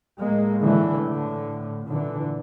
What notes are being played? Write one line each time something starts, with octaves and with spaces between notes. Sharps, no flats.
A2 G#3 A#3
D3 E3
D3
A#2 D3 E3